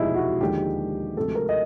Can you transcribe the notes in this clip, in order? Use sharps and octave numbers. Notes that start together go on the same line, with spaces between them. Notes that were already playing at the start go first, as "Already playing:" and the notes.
Already playing: E1 D2 C3 F3 G#3 D#4 E4 G#4
F#4
D#2 D3 F3 G#3 G4
D2 C3 F3 G#3 A4
A#4
D#5